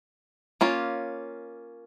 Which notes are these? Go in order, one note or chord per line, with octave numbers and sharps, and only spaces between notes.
A#3 C#4 F4 C#5